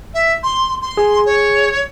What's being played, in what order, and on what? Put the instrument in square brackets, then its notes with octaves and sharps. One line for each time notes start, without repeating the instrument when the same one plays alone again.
[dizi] E5
C6
C6
[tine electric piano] G#4
[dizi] C#5